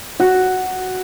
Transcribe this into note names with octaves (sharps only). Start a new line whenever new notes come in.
F#4